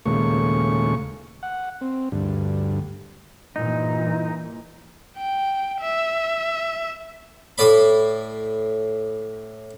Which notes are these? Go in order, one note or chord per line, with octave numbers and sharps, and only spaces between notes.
D#2 A#2 C#3 G#3 A3 C#6
F#5
C4
D2 G2
G2 A#2 E3 D#4
G5
E5
A2 D5 B5